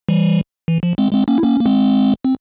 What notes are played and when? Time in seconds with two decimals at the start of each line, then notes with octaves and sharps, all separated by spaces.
0.09 E3 G3
0.68 E3
0.83 F3
0.98 G#3 C4
1.12 G#3 C4
1.28 A#3 C#4
1.38 E4
1.44 A#3 C#4
1.60 A#3
1.66 G#3 C4
2.25 C4